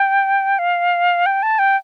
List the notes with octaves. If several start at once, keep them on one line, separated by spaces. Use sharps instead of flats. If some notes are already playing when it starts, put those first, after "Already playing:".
Already playing: G5
F5
G5
A5
G5